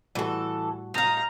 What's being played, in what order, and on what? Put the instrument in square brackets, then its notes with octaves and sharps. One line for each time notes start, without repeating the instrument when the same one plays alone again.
[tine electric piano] A2 G3 F#4 [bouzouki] E3 A4
[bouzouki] D#4 F5 [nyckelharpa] A#5